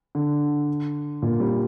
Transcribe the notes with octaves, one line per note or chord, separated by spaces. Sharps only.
D3
A#2
G3